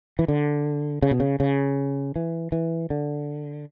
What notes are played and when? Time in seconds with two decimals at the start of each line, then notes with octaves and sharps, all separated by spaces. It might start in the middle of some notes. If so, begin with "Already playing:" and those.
0.19 E3
0.28 D3
1.02 C#3
1.11 B2
1.20 C#3
1.40 C#3
2.16 E3
2.52 E3
2.90 D3